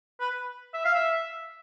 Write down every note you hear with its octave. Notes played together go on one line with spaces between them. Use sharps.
B4
E5
F5
E5